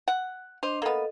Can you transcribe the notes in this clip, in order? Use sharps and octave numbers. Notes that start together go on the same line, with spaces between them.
F#5
D4 C5 D#5
A#3 B3 A4 D#5